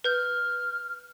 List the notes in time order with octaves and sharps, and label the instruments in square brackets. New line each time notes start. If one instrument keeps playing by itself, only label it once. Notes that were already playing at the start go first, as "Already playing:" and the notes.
[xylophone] B4 G6 [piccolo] F6